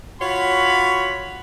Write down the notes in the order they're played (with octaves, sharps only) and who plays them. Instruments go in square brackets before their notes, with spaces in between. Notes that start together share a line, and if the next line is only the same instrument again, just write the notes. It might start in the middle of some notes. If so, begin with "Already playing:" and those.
[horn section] F4 F#4 C#5 B5